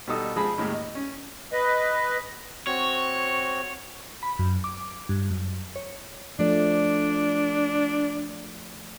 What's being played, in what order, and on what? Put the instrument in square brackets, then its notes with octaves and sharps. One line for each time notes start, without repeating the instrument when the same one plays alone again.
[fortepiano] B2 G3 D#4 A4 D#6
F3 G#3 G#4 A5 B5
D#2 A2 G#3
D#5
C#4
[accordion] B4 D#5
[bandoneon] C4 F#4 [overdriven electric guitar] C#5
[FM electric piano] B5
F#2
D6
G2
F#2
C#5
[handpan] F3 A3 D5 [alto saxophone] D4